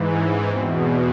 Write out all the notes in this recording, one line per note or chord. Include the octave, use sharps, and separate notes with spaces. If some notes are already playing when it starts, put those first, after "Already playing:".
Already playing: G#2 E3
C#4
E2 B2 C4